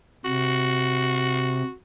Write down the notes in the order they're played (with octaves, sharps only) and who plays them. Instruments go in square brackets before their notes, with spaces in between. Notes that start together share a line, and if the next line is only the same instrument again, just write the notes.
[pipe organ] C3 [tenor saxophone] F#4